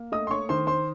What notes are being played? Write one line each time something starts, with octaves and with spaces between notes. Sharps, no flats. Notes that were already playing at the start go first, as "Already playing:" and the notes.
Already playing: A#3
A3 D#5 D#6
C6
C#5 C#6
D#3 C5 C6
C5 C6